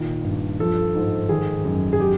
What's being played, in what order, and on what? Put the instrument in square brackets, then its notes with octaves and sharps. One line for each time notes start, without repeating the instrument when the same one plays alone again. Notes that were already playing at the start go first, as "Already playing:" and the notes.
Already playing: [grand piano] A#2 D#3
G2
F3 A4
G#2
D#3 G#4
F#2
G#4
F#3 G4